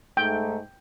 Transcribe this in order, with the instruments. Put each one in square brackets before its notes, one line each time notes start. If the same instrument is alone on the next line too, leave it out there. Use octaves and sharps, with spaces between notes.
[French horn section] G#2 A3 D#4 [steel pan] G5